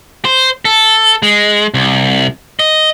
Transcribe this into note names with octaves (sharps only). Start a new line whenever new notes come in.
C5
A4
G#3
C2
D#5